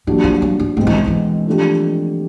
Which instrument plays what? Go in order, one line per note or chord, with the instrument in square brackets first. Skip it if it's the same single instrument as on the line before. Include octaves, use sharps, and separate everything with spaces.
[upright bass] E3 [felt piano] F#3 A#3 D4 G4
[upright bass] F3
F#3
F3
[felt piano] B2 G#3 C4 [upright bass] F3
[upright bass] E3
D#3
E3
[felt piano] F3 A3 D4 G4